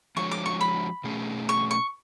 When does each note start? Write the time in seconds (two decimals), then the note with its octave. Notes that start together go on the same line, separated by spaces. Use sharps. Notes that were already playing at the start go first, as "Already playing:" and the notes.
0.17 F3 G#3 D4 F#4 C#5 C#6
0.31 D6
0.46 C#6
0.61 B5
1.04 B2 A3 C#4 G#4
1.49 C#6
1.71 C#6